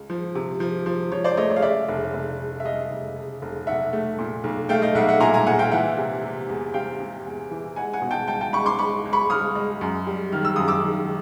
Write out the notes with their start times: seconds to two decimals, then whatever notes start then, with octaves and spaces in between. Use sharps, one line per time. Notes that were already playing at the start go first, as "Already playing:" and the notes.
Already playing: C#2
0.10 F3
0.35 C3
0.60 F3
0.86 F3
1.12 F3 C#5
1.24 C5 D5
1.37 A3 C#5 D#5
1.50 C#5
1.56 F5
1.62 C#3 D5 E5
1.88 F1
2.14 F1
2.39 C#3
2.60 E5
2.65 C#3 D#5 F5
2.91 F1
3.16 C#3
3.42 F1
3.67 B1 E5 F#5
3.93 A3
4.19 A#2
4.44 B1
4.69 A3 F5 G5
4.82 D#5 F5
4.95 B1 E5 F#5
5.09 E5 F#5
5.20 A#2 G#5 A#5
5.34 G#5 A#5
5.46 A#2 F#5 G#5
5.59 F5 G5
5.71 E3 E5 F#5
5.97 C3
6.24 C3
6.49 E2
6.74 C3 F5 G5
7.00 C3
7.26 E2
7.51 E3
7.76 G#3 F#5 G#5
7.93 F#5 G#5
8.02 B2
8.11 G5 A5
8.27 C#2 G5 A5
8.41 G5 A5
8.53 G#3 B5 C#6
8.66 C6 D6
8.79 G#3 B5 C#6
9.05 C#2
9.13 B5 C#6
9.30 C#2 D#6 F6
9.55 G#3
9.81 F#2
10.07 G3
10.32 D#3 F6
10.45 E6
10.56 F#2 D#6
10.68 D6 E6
10.84 D#3